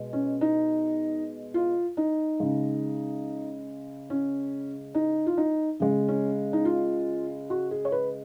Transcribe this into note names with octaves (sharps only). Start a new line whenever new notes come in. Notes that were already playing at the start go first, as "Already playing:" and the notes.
Already playing: B2 G#3
C#4
D#4
F4
D#4
C#3 G#3
C#4
D#4
F4
D#4
C#3 G#3
C#4
D#4
F4
F#4
G#4
C#5
B4